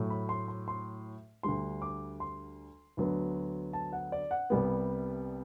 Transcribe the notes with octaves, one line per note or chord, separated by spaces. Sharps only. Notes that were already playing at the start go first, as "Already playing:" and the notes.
Already playing: A2 F#3 A3
B5
C6
C6
C6
D2 D3 G3 C6
D6
C6
D2 D3 F#3 B3
A5
F#5
D5
F#5
C2 C3 G3 B3